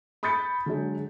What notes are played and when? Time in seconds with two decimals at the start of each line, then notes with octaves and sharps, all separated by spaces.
0.23 B5 D#6 G6 A6 B6 C#7
0.66 D3 F#3 G#3